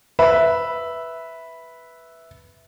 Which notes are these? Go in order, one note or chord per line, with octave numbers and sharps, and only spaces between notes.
B4 E5